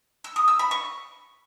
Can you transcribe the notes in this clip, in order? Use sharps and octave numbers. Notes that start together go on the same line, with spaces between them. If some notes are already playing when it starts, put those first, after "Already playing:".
E6
D#6
E6
B5
C#6